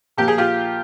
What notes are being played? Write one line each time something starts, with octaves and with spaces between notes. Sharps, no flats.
A#2 F3 G4
G#4
F4 G4